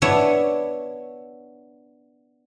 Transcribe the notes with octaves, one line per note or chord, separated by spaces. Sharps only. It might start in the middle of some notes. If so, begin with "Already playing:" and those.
B3 D4 E4 C#5